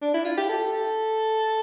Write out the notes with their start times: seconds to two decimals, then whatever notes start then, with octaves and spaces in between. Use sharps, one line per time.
0.02 D4
0.14 E4
0.25 F4
0.38 G4
0.50 A4